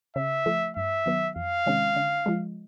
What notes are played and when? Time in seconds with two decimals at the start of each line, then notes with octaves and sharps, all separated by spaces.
0.16 C#3 E5
0.46 F3 A3
0.76 G2 E5
1.06 D#3 F#3 B3
1.36 F2 F5
1.66 C3 D#3 G#3 C#4
1.96 D3
2.26 F3 G#3